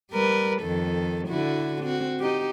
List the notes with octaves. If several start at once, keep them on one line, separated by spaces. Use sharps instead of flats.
G3 A#4 B4
F2 D#3 A4
D3 E4 F#4
C4 F#4
D#4 G4